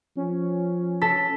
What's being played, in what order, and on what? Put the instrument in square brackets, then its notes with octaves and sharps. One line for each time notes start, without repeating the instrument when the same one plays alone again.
[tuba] F3 [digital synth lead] C#4
[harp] A4 [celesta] B6